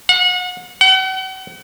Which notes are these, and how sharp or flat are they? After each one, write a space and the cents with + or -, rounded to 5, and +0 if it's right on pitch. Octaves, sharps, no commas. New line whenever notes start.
F#5 -35
F#5 +40